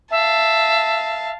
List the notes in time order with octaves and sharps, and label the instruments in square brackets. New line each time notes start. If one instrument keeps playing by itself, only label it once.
[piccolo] E5 [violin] F5 A5